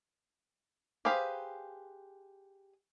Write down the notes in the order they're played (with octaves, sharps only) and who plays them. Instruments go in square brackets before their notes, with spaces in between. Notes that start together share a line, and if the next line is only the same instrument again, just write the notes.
[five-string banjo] G4 G#4 B4 C5 F5